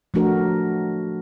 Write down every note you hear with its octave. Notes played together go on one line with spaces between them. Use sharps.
F3 A3 D4 F#4 A#4